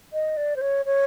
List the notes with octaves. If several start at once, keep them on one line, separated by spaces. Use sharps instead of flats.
D#5
D5
C5
C#5
C#5